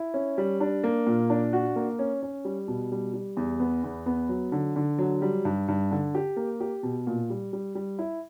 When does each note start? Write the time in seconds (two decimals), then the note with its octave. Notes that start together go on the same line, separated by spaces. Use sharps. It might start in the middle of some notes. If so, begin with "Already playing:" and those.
Already playing: E4
0.14 C#4
0.38 G3
0.61 D4
0.84 A#3
1.07 A#2
1.30 D4
1.53 F#4
1.76 A#3
1.99 C#4
2.23 C#4
2.45 G3
2.68 B2
2.92 G3
3.14 G3
3.37 E2
3.60 B3
3.84 E2
4.06 B3
4.29 F#3
4.52 D3
4.76 D3
4.99 F#3
5.22 G3
5.45 G2
5.68 G2
5.91 D3
6.15 G4
6.36 A#3
6.60 G4
6.83 B2
7.07 A#2
7.30 G3
7.53 G3
7.75 G3
7.99 E4